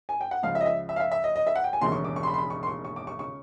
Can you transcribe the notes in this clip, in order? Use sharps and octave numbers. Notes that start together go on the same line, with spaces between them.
G#5
G5
F#5
C#2 C#3 F3 F5
E5
D#5
E5
E5
F5
E5
E5
D#5
D#5
E5
F#5
G5
G#5
E1 D#2 C#3 E3 C6
C#6
D6
C#6
C6
B5
C6
B5
C#6
C6
C#6
C#6
D6
C#6
C#3 C#6